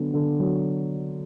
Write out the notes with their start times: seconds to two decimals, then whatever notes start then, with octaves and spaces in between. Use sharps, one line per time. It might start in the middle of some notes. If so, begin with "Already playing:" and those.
Already playing: D3 F#3 B3
0.14 D3
0.39 F#3